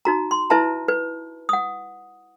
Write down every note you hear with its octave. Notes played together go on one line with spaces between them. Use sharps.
D#4 F#4 A#5
C6
E4 B4 E5 A5 A#5
B4
F#5 D#6